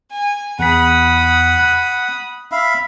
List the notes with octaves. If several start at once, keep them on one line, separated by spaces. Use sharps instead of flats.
G#5
E2 F#5 B5 D#6 B6
F#6
E5 F5 B5